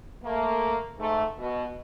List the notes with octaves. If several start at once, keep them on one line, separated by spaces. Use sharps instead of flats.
A3 A#3
G#2 A3
B2